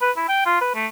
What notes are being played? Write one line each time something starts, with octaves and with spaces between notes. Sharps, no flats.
B4
E4
G5
F4
B4
A3